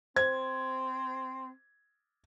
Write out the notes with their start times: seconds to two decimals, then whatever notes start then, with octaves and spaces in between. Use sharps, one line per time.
0.16 C4 C5 G#6